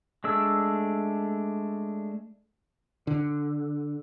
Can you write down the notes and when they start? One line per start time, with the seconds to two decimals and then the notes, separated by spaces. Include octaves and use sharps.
0.24 G#3 A3 D4 E6
3.07 D3